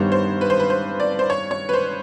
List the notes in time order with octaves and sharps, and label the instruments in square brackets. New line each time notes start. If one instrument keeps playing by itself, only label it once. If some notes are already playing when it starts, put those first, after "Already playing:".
Already playing: [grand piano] G2 D#3 G3 B3 D#4 [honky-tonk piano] C5 C#5
[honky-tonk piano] C5
B4
C5
B4
C5
D5
C5
C#5
C#5
B4
C5